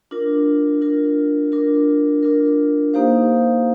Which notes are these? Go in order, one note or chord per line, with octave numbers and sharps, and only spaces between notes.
D4 F4 A#4
D4 F4 A#4
D4 F4 A#4
D4 F4 A#4
A#3 D#4 G4 C5 F5